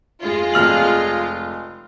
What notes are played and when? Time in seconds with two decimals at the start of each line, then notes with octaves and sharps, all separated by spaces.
0.23 F2 G#3 F4
0.54 F1 F6 F#7